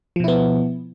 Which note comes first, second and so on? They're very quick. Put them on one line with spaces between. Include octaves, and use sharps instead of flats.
F3 B2 E4 B3